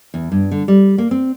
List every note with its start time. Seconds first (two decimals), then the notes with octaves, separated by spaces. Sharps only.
0.14 E2
0.32 G2
0.51 D3
0.68 G3
0.98 A#3
1.11 C4